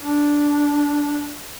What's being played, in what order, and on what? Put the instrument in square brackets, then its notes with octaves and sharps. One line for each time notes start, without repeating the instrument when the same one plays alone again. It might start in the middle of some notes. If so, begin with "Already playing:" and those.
[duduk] D4